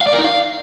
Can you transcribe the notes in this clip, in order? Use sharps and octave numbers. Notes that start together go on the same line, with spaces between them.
F5
D5
A#4
D#4
F5